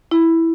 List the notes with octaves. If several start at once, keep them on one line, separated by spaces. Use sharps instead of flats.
E4